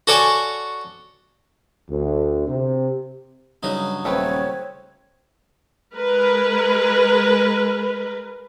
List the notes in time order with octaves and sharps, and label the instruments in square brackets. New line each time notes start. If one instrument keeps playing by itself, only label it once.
[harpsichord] F#4 A4 C#5 D5 G#5
[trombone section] D2
C3
[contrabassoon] G2 [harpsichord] C#3 F#3 D#4
[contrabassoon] D#1 [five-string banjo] A3 C4 B4 [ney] C#5
[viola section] G#3 A#4 B4